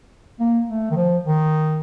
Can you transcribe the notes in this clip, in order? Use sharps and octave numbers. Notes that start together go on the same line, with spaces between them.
A#3
A3
D#3
F3
D#3